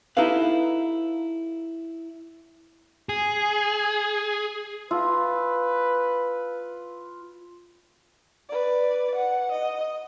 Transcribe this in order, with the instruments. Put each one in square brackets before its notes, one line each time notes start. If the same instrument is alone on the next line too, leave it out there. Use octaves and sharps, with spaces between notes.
[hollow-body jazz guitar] D#4 E4 G4 A4 B4 F5
[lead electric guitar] G#4
[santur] F4 [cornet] B4 [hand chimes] F5 A5 E6
[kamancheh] B4 D5
F#5
D#5